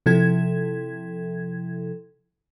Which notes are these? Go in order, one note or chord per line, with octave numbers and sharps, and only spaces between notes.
C3 F3 E4 A4 G#6